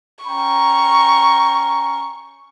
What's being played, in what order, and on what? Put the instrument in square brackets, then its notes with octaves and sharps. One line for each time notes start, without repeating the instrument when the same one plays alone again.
[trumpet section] C#4 G5 A#5 [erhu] C#6